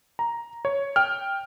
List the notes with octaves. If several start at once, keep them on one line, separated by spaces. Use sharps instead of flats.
A#5
C#5
G5 F6